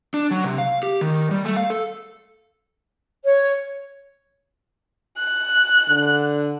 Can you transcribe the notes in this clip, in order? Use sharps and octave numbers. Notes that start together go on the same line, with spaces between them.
D4
F#3
C3
F5
G4
D#3
G3
A3
F5
A4
C#5
F#6
D3